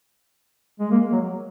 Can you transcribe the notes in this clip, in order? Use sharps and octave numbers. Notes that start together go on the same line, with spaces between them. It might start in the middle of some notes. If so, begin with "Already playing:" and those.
G#3
A#3
F#3